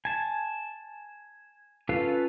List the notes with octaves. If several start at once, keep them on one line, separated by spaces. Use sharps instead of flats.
G#5 A5
C#4 F4 A4 B4 F5